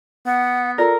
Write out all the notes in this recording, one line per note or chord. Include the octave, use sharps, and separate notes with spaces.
B3 F#5
F4 A4 A#4 D5 A#6